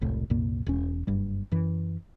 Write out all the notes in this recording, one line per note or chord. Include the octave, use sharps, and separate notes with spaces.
E1 C2 A2
C2 F#2 A#2 A#3
E1 E2 C#4
F#1 G2 G3
F#2 E3